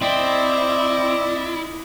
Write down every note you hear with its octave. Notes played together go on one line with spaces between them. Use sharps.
C4 E4 D5 D#5 G5